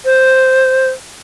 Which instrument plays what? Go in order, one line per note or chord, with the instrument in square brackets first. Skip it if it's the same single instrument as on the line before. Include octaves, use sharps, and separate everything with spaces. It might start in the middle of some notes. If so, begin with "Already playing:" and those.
[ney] C5